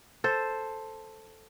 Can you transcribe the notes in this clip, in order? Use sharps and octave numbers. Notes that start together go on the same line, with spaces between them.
A4 C5